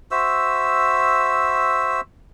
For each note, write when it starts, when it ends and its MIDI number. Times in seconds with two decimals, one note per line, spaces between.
0.11 2.01 66
0.11 2.01 72
0.11 2.01 76
0.11 2.01 88